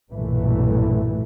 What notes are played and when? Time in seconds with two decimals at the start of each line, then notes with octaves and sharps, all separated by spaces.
0.13 B1 G2 A#2 E3 A3